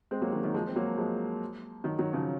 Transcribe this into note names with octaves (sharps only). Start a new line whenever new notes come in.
G#3 C4
F#3 A#3
D#3 F#3
D#3 F#3
F3 G#3
C4
F#3 A#3
F3 G#3
D#3 F#3
D#3 F#3
C#3 F3